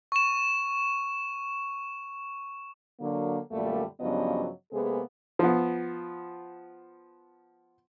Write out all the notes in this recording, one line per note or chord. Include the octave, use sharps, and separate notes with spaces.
C#6 E7
D3 F#3 A#3
F#2 A#2 D3 G3 A3 A#3
G2 C#3 F3 F#3 B3 D#5
C3 G#3 A#3 B3 G#4 A4
F3 B3